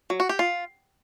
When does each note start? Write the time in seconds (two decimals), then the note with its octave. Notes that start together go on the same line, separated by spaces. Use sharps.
0.10 F#3
0.20 F#4
0.29 G4
0.39 F4